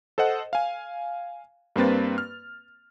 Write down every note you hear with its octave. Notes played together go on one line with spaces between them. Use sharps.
A4 C5 D#5 F#5
F5 G#5
G2 A#3 C4 B4 A6
F6